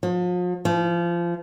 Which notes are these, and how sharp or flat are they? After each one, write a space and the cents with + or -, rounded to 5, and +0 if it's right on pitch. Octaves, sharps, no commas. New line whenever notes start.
F3 +40
F3 -25